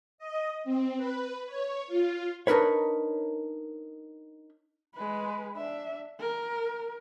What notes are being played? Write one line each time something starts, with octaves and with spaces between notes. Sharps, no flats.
D#5
C4
B4
C#5
F4
D4 D#4 A#4 B4 C#5
G#3 B4
D4 E5
A#4